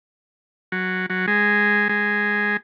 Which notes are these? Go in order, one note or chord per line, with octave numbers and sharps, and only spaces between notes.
F#3
F#3
G#3
G#3